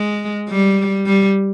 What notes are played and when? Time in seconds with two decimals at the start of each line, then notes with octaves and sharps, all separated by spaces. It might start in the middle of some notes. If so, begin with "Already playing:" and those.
Already playing: G#3
0.49 G3
1.06 G3